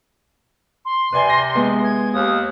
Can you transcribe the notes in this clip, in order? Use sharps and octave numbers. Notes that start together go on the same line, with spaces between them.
C6
C3 B4 D5 G#5
A#6
G#3 B3
G#6
D#2 D#6